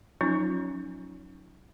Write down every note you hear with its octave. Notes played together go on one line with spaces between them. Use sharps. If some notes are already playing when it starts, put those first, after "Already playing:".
F3 F#3 C#4 D#4 F4